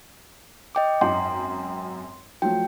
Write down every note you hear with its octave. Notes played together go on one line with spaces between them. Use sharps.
D#5 G5 D6
G#1 F#2 G5 C6
F3 F#3 A3 G5